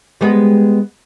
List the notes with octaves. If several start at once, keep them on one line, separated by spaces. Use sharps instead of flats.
G3 G#3 B3